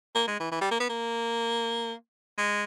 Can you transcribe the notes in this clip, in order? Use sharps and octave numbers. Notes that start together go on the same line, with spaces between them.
A#3
G#3
E3
E3
G3
A#3
B3
A#3
G#3